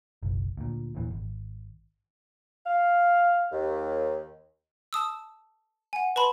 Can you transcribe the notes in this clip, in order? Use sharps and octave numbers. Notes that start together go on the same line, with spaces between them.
F#1 B1
D2 A#2
D#1 D#2 A#2 E3
G#1
F5
D#2
A5 D#6 E6
F#5 G#5
B4 A5 B5 C6